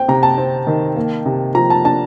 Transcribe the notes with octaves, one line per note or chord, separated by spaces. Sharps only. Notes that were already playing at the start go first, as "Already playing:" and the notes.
Already playing: C4 G5
C3 A#5
A5
C4
D#3
A#3
C3
F3 A#5
A5
D4 A5